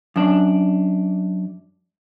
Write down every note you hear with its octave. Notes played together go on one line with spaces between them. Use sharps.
F#2 D4